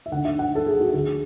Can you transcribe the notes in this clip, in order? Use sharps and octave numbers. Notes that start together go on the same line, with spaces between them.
E5
D2 D3 F#5
E5
F#5
A4
G#4
F#4
D2 D3 G#4